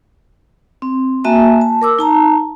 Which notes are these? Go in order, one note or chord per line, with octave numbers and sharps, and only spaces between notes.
C4
A#3 F#4 E5 G#5 A5
A5
A#4 D6 E6
D#4 A5 A#5